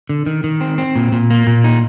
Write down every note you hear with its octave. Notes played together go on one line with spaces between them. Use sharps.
D3
D#3
D#3
C4
C4
A#2
A#2
A#3
A#2
D#4